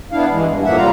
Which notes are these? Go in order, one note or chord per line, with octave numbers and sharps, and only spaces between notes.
B3 D4 E4 F5
G2 E3 G#3
G2
F2 A2 F3 A#3 E5 F#5
D#2 C3 G3 F4 F5 A#5